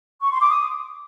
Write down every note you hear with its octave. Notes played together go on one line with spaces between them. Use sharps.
C#6
C6
D6
D#6